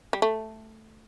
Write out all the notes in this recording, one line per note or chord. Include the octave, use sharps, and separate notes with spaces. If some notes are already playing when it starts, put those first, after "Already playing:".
G3
A3